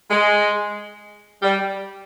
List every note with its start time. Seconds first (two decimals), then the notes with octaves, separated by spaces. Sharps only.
0.10 G#3
1.42 G3